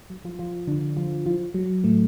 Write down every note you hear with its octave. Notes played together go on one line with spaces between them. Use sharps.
F#3
F3 F4
F3 F4
D3 D4
F3 F4
F3 F4
F#3
A2 A3